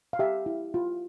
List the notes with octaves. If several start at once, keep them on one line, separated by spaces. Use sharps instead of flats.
F5
G4 E5
E4
F4